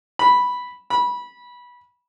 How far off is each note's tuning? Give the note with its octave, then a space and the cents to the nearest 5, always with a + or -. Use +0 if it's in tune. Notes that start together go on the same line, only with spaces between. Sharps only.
B5 -5
B5 -20